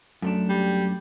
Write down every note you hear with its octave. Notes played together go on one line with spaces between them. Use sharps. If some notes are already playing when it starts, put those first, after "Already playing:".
F#2 A3 D4
G3